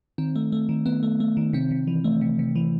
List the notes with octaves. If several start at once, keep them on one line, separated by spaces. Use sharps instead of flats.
D#3 C4
A3
A3
D#3
D#3 B3
A3
A3
D#3
C3 C4
C3
E3
A3
C3
C3
E3